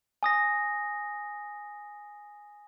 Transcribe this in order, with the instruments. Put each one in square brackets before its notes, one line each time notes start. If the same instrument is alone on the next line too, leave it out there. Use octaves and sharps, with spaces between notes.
[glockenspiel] G#5 D#6 A#6